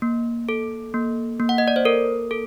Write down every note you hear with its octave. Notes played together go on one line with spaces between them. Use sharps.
A#3
A4
A#3
A#3
F#5
D#5
D5
C5
A4 A#4
A4